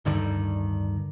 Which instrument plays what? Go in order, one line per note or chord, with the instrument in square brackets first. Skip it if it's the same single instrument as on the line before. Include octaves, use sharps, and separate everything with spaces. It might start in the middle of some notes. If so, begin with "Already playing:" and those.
[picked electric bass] D1 G2 D3 D#3